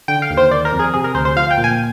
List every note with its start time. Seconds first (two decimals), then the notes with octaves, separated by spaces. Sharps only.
0.08 D3 G5
0.22 F5
0.30 D#2
0.37 C5
0.51 D#3 D5
0.65 A#4
0.72 F2
0.79 G#4
0.94 C3 G#4
1.04 A#4
1.15 D2 C5
1.25 C5
1.36 F3 F5
1.51 G5
1.58 A#2
1.64 G#5